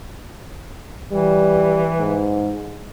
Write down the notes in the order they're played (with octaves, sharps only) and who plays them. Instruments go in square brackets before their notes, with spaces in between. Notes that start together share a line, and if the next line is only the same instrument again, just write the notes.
[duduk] E3 [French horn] G3
[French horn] G#2